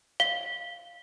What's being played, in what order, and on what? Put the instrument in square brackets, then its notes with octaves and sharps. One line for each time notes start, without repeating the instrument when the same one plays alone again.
[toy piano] F5 [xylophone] G7